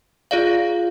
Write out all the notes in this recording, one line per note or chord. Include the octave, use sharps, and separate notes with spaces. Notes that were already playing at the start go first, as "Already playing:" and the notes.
F4 G#4 D5 F5